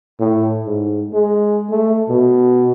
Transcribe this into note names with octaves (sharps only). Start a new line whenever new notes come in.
A2
G#2
G#3
A3
B2